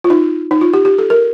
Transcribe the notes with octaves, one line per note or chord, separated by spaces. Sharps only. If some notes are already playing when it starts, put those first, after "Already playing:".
F4
D#4
D#4
F4
G4
G4
A4
A#4